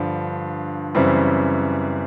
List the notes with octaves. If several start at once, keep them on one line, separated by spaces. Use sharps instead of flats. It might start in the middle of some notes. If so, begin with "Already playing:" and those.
Already playing: G2 D3 F3
F#2 C#3 E3 G3 C4